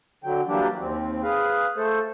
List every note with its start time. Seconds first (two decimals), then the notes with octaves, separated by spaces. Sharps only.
0.24 D3 F#3 G5
0.48 E3 F#3 G3 A#3 D4 G4
0.79 D#2 C4
1.23 G#4 B4 F5
1.77 A3 A4 C5